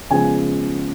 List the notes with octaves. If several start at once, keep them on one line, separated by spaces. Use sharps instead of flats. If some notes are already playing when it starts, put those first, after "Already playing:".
C#3 F3 G#3 B3 G#5